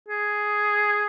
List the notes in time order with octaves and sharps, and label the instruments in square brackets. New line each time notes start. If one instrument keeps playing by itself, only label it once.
[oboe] G#4